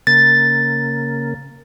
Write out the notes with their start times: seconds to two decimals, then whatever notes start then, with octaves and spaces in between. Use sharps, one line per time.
0.07 C#3 A#3 A6